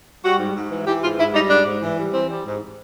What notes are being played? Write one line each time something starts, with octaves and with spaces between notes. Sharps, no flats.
G3 F#4
G#2
G#2
E3
E3 G4
G#2 F4
G#2 E4
G3 D#4
G#2 D4
G#2
E3
G3
E3 C4
G3
G#2